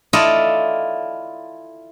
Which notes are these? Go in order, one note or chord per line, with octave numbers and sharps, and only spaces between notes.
E4 F4 A4 D5 D#5